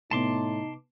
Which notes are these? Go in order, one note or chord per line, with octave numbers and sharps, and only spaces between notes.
A2 C3 B3 D#4 A5 C6 D6